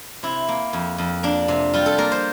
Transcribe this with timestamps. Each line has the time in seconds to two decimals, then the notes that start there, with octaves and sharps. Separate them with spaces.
0.23 C3 E4
0.48 A#3
0.73 F2
0.98 F2
1.23 A#3 D4
1.48 C3
1.73 G3 F4
1.86 A4
1.98 A#3 A#4
2.12 C5